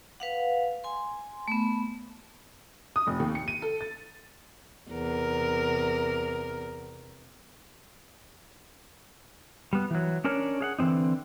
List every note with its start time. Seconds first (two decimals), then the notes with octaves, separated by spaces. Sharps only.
0.20 B4 F5 F#5
0.84 G#5 C6
1.48 A3 B3
2.96 D#6
3.07 F1
3.20 D#2
3.35 C#7
3.48 D#7
3.62 A4
3.81 A6
4.90 E2 C3 A#4
9.73 G3 B3
9.91 E3 F#3
10.24 C#4 D4 A#4 C#5
10.61 G#4 F5 F#5
10.79 D3 E3 F3 C4 D#4